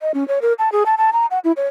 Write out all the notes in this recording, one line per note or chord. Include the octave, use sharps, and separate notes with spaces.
D#5
C#4
C#5
A#4
A5
G#4
A5
A5
A#5
F#5
E4
C#5